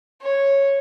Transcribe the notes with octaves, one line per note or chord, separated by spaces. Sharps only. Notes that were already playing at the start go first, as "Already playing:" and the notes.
C#5